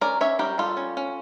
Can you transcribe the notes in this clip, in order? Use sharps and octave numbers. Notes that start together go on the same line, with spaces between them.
C#4 A#4 D5
C#4 C#5 E5
G3 G4 A#4
G3 F4 A4
C#4
C#4